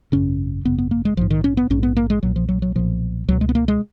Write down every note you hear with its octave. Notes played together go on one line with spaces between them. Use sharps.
G#1 F#2 C#3 C#4
G#1 F#2 C#3 B3
B3
A#3
G#3
A#1 G#2 F3
D#3
C#4
B3
A#1 G#2 C#4
B3
A#3
G#3
B1 A#2 F#3
F3
F#3
F#3
B1 A#2 F3
C#2 B2 F#3
G#3
B3
A#3
G#3